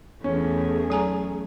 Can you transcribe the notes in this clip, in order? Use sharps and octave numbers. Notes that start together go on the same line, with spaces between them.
E2 A3 C#4 G#4
F#3 G#5 A#5